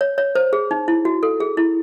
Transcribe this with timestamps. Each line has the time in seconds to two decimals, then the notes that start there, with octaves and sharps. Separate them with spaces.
0.01 C#5
0.18 C#5
0.35 C5
0.53 G#4
0.71 D#4
0.88 E4
1.05 F#4
1.23 A4
1.40 G#4
1.57 E4